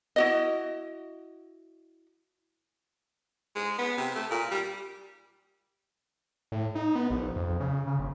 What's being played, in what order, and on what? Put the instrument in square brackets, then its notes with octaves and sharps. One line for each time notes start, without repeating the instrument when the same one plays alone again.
[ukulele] E4 F#4 D#5
[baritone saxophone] G#3
B3
C3
A3
A#2
G3
[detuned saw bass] A2
D#4
B3
A#1
F2
C#3
C#3
G1